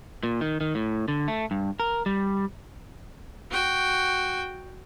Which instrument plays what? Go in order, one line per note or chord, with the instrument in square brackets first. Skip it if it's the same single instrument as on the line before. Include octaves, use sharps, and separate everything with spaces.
[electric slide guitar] A#2
D#3
D#3
A2
D3
A3
G2
A#4
G3
[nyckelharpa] F#4 G5